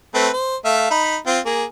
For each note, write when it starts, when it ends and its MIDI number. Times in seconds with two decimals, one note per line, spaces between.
0.14 0.28 57
0.14 0.28 60
0.14 0.28 71
0.33 0.56 72
0.65 0.89 57
0.65 0.89 76
0.65 0.89 77
0.90 1.17 63
0.90 1.17 83
1.27 1.39 60
1.27 1.39 65
1.46 1.64 58
1.46 1.64 68